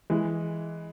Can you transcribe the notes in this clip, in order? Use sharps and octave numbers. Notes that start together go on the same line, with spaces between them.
E3 G#3